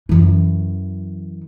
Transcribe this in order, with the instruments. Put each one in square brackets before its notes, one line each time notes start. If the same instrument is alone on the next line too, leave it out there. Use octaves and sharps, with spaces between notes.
[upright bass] F#2 E3